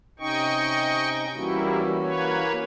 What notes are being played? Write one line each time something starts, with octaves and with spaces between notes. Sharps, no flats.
C3 C#4 D#4 D#5 G5 C#6
E3 G3 A#3 C#4 E4 F#4
A#3 B4 C#5